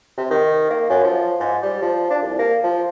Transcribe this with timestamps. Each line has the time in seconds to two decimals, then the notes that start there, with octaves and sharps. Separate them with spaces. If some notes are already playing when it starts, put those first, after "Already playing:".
0.17 C3
0.30 D#3
0.70 A#3
0.89 F#2
1.03 F3
1.40 G#2
1.63 G3
1.82 F3
2.10 D4
2.23 C2
2.39 A#3
2.63 F3